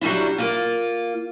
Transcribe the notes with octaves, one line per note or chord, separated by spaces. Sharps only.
F#3 G3 A#3 D4 E4
A#3 F4